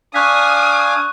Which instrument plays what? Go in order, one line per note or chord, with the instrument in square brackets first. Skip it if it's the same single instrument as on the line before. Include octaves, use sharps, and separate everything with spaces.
[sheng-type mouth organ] D4 F5 G#5 [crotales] C#6 F#6 B6 [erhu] D#6